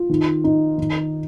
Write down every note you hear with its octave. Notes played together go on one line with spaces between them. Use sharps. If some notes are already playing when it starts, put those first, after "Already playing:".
Already playing: F4
D#3
D#4
D#3